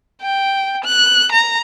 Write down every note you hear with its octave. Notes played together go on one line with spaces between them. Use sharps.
G5
F#6
A#5